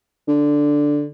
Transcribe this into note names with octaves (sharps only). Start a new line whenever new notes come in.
D3